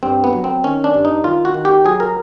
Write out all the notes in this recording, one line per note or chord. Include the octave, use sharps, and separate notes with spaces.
G2 C4
B3
F#3
C4
D#3 C#4
D4
G2
D#4
D#3 F4
F#4
D#3
G4
F#3 G#4
A#4